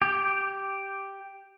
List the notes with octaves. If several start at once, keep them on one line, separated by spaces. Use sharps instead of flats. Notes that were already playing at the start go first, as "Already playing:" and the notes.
G4